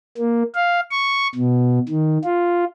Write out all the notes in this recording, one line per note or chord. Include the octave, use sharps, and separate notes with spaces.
A#3
F5
C#6
B2
D#3
F4